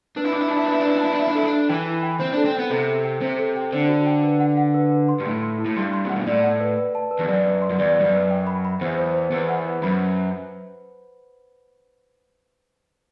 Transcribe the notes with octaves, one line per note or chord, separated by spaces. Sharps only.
D4 B4
E4
D4 D6
E4
D4 A5
E4
D4
E4 B4
D4
E4 B4
D4
E4 A5
D4
E4 E5
D4
E4 A4
D4
E5
E3 G5
E4
G5
C4 C5
D4 A4
C4
B3 G5
C3 A4
A4
G5
C3 C5
A4
G5
D3 C5
F#4
G5
B4
F#5
F#5
B4
B4
C6
G2
A2 C6
C6
E4
A2
G2 C6
C6
C3 F#5
B2
A2 D5
F#5
B4
B4
A5
B4
E2
F#2 D5
B4
C6
F#2
E2 D5
G2 D5
F#2
B4
G5
B5
B5
E2 C5
C5
C5
E2 B4
F#5
B4
F#2 B5